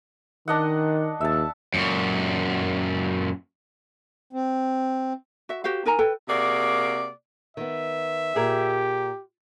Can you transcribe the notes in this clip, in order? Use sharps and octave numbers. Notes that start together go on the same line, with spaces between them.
D#3 D4 D#5 F#5
D#2 E5 A5
F#2 A#2
C4
F#4 E5
F#4 G4 C5 F5
D#4 A#4 G#5 A#5
A4 B4 G5
C3 A#3 F#4 G#4 D5
D#3 B3 E5
A#2 G4 G#4 A#4